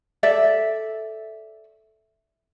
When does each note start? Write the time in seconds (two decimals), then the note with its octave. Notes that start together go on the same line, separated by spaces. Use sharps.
0.23 A4 D5 E5